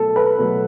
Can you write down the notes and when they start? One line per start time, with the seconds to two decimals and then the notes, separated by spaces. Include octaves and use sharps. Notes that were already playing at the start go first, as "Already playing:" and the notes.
Already playing: B2 F#3 A3 A4
0.16 B4
0.38 B2 F#3 A3